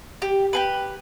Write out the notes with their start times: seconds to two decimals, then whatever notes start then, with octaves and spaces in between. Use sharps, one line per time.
0.22 G4
0.53 G4 G#4 B4